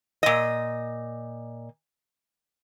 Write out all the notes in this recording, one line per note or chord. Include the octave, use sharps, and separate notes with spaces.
A#2 D#5